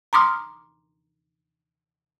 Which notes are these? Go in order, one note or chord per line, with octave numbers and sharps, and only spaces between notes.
A#5 C6 D6 D#6 F6